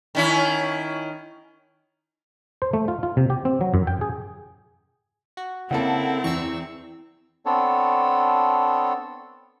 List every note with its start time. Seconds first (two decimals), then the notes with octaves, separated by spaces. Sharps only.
0.15 D#3 C#4 E4
2.62 C5
2.73 A3
2.88 F4
3.03 F4
3.17 C3
3.30 G4
3.45 C4
3.61 F#3
3.74 F#2
3.87 G5
4.01 G#4
5.37 F#4
5.71 C#3 A#3 C4 E4 A4 F#5 A5
6.24 E2 C#6 E6
7.46 B3 C4 D4 A4 C#5